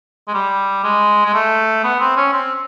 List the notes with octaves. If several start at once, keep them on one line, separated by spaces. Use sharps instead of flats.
G#3
G3
G#3
G#3
A3
B3
C4
C#4
C4